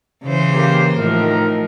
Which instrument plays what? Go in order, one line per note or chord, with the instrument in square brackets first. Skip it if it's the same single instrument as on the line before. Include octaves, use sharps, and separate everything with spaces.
[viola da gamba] C#3 E3 C5
[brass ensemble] A#3 G4
[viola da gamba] A2 F3 [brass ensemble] D#3 D#4 A#4